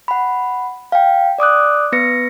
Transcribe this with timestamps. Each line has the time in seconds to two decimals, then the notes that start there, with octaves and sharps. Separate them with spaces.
0.08 F#5 B5
0.92 F5 G5
1.38 D5 D6 D#6 F#6
1.92 B3 B4 A#6 C#7